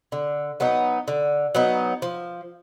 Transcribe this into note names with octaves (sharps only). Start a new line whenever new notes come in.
D3
F#3 B3 D#4
D3
F#3 B3 D#4
F3